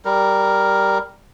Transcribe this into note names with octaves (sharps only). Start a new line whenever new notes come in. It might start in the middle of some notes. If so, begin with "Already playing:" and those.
G3 A#4